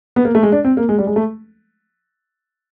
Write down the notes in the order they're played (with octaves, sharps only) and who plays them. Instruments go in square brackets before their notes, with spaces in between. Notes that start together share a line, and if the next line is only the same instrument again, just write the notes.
[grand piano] B3
A#3
A3
G#3
D4
C4
A#3
G#3
G3
G#3
A3